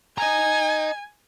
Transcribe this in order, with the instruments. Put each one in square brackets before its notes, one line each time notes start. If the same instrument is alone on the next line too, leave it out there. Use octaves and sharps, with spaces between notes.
[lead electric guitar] D#5 A#5 [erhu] G#5